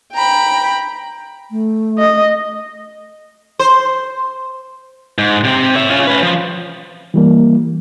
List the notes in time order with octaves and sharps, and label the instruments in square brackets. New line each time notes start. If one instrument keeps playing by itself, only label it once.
[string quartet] G5 A#5 B5
[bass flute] A3
[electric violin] D#5
[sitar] C5
[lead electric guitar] G#2
C3 C4
C#5 E5
C#4 F4
C#4 B4
F3
[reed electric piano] E3 G3 A#3